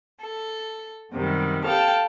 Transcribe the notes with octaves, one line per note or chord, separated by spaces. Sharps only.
A4
F#2 C3 D#3 G3
A4 F5 G5 A5 F6